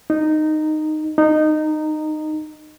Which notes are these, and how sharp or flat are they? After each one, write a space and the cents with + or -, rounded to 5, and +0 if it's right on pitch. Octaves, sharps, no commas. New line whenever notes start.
D#4 -10
D#4 -15